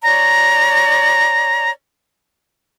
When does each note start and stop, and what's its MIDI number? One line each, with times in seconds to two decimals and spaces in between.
0.03 1.71 73
0.03 1.71 74
0.03 1.71 82